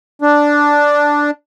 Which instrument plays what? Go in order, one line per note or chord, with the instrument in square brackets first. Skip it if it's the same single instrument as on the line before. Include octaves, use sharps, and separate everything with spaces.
[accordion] D4